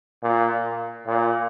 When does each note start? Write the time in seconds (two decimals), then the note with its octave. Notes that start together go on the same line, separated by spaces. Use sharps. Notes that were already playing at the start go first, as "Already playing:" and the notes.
0.23 A#2
1.06 A#2